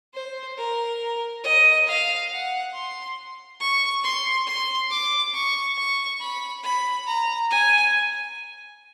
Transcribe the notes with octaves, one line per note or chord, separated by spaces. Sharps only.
C5
A#4
D#5
F5
F#5
C6
C#6
C6
C6
D6
C#6
C#6
B5
B5
A#5
G#5